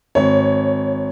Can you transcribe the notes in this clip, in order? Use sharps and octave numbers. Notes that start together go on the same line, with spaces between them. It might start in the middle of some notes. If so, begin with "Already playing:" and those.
G#1 C#5